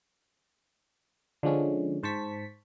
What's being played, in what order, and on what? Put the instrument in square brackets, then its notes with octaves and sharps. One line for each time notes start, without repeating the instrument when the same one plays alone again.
[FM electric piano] D3 F3 G#3 C#4
G#2 C5 A5 C#6 B6